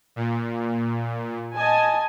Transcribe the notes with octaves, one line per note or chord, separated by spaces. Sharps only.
A#2
D#5 G#5 A5